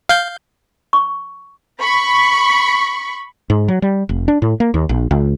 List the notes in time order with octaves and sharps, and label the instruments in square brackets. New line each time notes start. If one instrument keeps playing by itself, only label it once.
[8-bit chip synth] F5 G6
[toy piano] C#6
[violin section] B5 C#6
[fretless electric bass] G#2
F#3
G3
F1
D4
A2
A#3
D#2
A#1
C#2